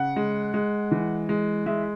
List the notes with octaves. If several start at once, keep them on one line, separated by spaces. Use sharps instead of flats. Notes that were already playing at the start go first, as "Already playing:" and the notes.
Already playing: C#3 F#5
G#3
G#3
E3
G#3
G#3 E5